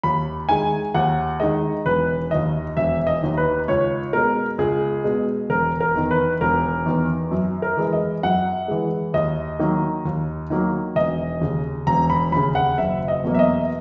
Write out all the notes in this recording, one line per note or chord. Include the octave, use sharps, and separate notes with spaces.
D#2 B5
D#3 G#3 G#5
D#2 F#5
D#3 G#3 D#5
E1 B4
D#2 D#3 D#5
E1 E5
D#5
D#2 D#3
B4
C#2 C#5
B2 G#3 A#4
C#2 G#4
B2 G#3
E1 A#4
A#4
E2 D#3
B4
E1 A#4
E2 D#3
F#2
A#4
E3 G#3
D#5
F#2 F#5
E3 G#3
D#2 D#5
D#3 F#3 A#3
D#2
D#3 F#3 A#3
E1 D#5
D#2 C#3
E1 A#5
B5
D#2 C#3 B5
F#5
F#1 E5
D#5
E2 B2 F#3 A#3
E5
D#5